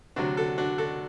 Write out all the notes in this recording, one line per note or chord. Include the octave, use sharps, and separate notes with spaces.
D2 C3 F#3 D4 F#4
F#4 A4
D4 F#4
F#4 A4